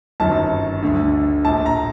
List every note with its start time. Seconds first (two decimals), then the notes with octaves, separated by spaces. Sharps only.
0.20 G1 F#2 D#3 A5
0.83 D2 D3
1.45 A#1 A2 A5
1.66 A#5